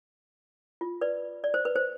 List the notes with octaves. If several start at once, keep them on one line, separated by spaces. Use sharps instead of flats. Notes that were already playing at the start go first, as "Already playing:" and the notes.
F4
B4 D5
D5
C5
B4
C5